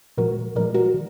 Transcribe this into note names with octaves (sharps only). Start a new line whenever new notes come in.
A#2 F3 G#3 F#4 A#4
A#2 F3 G#3 A#4 D5
F#4 A#4
D#3